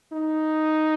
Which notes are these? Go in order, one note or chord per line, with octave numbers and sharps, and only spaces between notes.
D#4